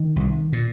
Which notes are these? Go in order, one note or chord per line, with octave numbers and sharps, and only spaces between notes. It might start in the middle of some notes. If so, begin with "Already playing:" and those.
Already playing: D#3
C2
A#2